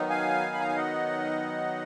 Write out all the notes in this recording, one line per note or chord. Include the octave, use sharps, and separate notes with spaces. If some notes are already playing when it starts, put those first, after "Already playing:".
Already playing: D#3 F#3 B3 D#4
F5 G#5
B5
A#5
G#5
D#5 F#5